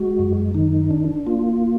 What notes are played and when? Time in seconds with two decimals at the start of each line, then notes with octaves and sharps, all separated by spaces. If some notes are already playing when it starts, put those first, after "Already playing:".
Already playing: G#3 F#4
0.19 F#2
0.55 D#3 D#4
0.91 D4
1.27 A#3 F4